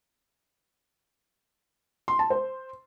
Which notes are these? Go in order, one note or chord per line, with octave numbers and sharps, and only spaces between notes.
C6
A5
C5